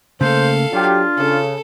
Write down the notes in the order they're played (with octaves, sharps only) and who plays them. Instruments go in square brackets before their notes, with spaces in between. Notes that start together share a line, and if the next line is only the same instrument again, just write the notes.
[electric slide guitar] C#3 A3 A#3 [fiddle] A4 F5 [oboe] C5
[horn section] F#3 G4 [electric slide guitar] D4 [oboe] F4
[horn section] C#3 [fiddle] A4